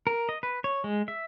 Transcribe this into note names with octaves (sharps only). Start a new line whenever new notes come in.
A#4
D#5
B4
C#5
G#3
E5